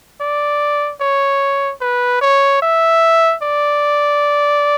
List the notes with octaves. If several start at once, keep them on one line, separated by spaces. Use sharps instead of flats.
D5
C#5
B4
C#5
E5
D5